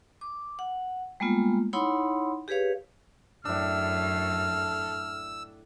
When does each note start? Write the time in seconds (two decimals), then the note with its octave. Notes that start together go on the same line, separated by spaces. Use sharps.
0.21 D6
0.59 F#5
1.20 G3 G#3 A#3 B3 F4
1.73 D#4 E4 C#5 F#5 B5 C6
2.48 G4 G#4 B4 C#5 F5
3.45 F#2 A2 D4 A4 E6 F6